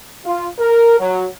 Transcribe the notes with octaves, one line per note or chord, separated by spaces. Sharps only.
F4
A#4
F#3